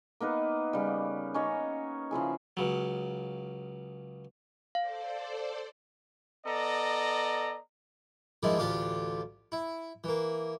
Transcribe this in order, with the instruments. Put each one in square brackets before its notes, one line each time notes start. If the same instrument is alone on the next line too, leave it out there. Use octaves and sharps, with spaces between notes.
[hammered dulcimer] A#3 B3 D#4 B4
C#3 G3
C#4 D#4 C#5 D#5
C#3 F3 E4 G#4
[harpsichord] C#2 C#3 F#3
[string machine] A4 C5 D5 [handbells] F5
[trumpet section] B3 A4 D5 D#5 A#5
[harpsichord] D#3 F3 G#3 D4 E4
A1 D2 D4 F4 G4 F5
E4
E3 A#3